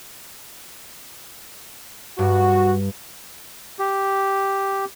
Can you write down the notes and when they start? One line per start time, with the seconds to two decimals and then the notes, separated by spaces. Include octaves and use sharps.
2.19 G2 F#4
3.79 G4